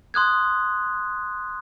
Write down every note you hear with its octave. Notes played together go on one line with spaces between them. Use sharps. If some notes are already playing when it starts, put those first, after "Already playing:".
C6 D#6 F#6 G#6